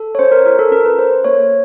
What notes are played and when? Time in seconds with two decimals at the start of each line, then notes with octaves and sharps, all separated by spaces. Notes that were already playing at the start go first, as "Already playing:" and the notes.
Already playing: A4
0.15 C#5
0.19 C#4 C5
0.32 A#4
0.46 F4 A#4
0.59 A4
0.71 C#4 A#4
0.85 B4
0.99 A4 C5
1.24 A#3 C#5